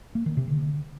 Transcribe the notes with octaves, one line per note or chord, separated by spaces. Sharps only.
A#3
D#3
C3
D3